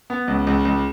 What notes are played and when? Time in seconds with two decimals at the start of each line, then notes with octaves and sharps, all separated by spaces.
0.10 B3
0.28 C#2
0.47 C#2
0.65 C#2